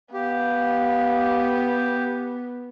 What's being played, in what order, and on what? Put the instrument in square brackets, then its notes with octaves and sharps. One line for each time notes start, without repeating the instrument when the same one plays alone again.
[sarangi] B3 [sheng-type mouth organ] G4 [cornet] F5